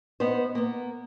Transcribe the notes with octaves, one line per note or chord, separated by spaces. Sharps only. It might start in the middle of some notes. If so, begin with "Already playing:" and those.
B3 D#4 B4 C5
A#3 B3